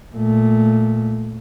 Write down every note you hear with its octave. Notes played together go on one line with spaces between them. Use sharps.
A#2 A3